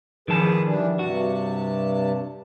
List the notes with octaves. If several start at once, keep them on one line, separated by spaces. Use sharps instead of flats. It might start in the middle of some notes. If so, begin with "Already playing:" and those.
D#3 F3 G#4 B4 A5
E3 G3 D4
G2 C3 F#4 A5